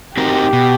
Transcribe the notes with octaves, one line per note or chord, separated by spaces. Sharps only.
C4 D#4 F#4 G4 A#4
B2